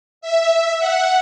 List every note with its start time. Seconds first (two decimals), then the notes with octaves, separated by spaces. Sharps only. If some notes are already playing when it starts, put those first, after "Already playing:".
0.21 E5
0.79 F#5